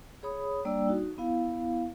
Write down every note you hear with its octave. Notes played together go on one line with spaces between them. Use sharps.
G#4 C#5 B5 D#6
G3 A#3 D4 D5 G5 E6
D#4 F#4
B3 E4 F5